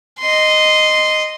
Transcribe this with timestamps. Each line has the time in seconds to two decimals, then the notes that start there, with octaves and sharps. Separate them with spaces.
0.20 D#5 C6